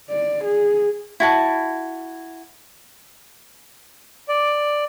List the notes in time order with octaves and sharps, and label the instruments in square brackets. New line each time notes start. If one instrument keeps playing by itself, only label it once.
[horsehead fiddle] D5
G#4
[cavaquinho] E4 F#4 A5
[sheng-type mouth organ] D5